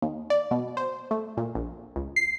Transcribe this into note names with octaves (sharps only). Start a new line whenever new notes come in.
D#2
D5
B2
C5
A3
A#2
A#1
C#2
C7